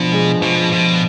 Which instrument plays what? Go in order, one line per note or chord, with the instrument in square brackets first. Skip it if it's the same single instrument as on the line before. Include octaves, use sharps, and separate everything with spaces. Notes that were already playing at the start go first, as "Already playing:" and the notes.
Already playing: [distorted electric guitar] B2 [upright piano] F3 D4
[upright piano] G#3
[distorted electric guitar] B2 [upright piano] F3
[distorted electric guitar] B2 [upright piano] F3